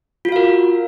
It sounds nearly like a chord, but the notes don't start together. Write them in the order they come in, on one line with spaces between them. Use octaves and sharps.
F4 F#4 F5 A#4